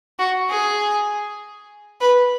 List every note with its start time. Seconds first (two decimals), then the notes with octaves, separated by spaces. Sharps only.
0.19 F#4
0.50 G#4
2.00 B4